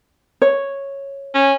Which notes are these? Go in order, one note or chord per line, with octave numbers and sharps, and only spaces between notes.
C#5
C#4